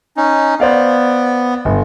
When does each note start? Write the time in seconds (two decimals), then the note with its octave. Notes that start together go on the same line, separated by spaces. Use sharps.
0.17 C#4 D#4
0.60 B3 C5 D5 F5
1.65 G1